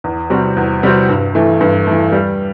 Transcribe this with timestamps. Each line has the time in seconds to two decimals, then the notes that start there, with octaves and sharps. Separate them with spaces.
0.04 E2
0.30 C3 G3 C4 F#4
0.57 E2
0.83 C3 G3 C4 F#4
1.09 G2
1.35 E3 A3
1.61 G2
1.87 E3 A3
2.12 G3